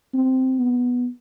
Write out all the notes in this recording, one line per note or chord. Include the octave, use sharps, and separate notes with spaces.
C4
B3